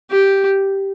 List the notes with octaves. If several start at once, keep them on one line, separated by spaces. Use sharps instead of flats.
G4